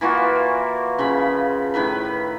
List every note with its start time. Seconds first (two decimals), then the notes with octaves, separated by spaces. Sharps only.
0.01 E3 A#3 F4 F#4
0.98 C#3 F3 B5
1.74 A2 D#3 B4 B5